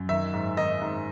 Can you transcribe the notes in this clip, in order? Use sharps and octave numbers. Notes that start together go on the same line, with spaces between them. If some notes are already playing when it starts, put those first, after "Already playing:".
Already playing: F#2
D#3 E5
G#2
D#3 D#5
G#2